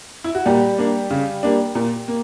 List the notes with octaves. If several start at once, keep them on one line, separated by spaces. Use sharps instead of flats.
E4
F#4
A#2 G3 G4
A#3 D4
C#3
G3 A#3 D4
A#2
A#3